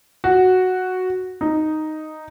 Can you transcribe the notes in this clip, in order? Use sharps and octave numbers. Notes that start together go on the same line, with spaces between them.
F#4
D#4